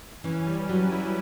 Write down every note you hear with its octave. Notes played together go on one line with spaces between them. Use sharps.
E3 C#4
G3
F#3 B4
E4